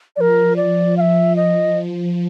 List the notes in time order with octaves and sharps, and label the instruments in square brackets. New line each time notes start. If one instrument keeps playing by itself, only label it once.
[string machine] F3 [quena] A#4 D5
[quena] D5
[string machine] F3 [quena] F5
[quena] E5
D#5